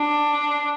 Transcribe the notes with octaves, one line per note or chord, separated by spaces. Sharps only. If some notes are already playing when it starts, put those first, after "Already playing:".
Already playing: D4